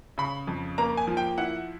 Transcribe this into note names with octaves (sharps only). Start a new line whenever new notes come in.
C#3 B5
F2
A#3 A#5
G#5
F3
G5
E4 F#5